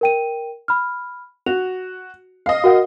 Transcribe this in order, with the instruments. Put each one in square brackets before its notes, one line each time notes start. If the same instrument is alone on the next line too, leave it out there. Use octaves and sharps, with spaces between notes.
[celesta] A#4 G5 D#7
B5 F6
[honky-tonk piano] F#4 [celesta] F7
[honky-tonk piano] D#5 F5
[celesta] F#4 A#4 F#5